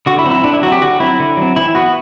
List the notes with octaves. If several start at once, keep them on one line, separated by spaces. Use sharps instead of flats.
D3 F#4
E4
F#3 C4
E4
D3 D4
E4
F#3 C4 F#4
G4
D3 F#4
F#3 C4 E4
D3
F#3 C4
E3 E4
B3 F#4